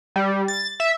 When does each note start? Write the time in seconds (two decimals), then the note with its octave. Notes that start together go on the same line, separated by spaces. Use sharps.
0.16 G3
0.48 A6
0.80 E5